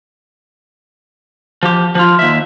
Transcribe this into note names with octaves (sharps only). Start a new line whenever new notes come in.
F3 G4
F3 F4
D#2 E5